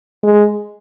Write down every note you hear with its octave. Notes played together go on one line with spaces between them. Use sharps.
G#3